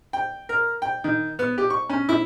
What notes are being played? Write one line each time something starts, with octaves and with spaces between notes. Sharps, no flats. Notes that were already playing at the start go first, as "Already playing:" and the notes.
G5
A#4
G5
D#3
B3
G4
C#6
C#4
E4